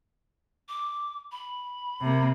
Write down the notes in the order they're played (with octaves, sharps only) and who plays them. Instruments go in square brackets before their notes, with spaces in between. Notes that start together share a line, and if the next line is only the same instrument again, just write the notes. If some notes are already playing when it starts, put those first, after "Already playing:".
[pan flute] D6
B5
[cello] C3 A#3